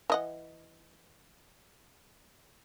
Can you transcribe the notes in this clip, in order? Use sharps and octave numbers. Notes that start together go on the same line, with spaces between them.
E3 D#5 F#5